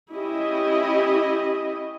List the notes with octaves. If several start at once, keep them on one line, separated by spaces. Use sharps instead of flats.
C#4 E4 G4 D#5